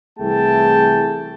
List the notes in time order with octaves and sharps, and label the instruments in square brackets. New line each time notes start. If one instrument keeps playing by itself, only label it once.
[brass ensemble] C2 E3 A3 G#4 G5 A5